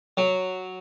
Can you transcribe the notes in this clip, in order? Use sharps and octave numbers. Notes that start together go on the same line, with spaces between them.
F#3